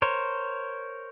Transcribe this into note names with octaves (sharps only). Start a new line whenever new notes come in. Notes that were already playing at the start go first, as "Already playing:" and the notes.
A#4 C5 C#5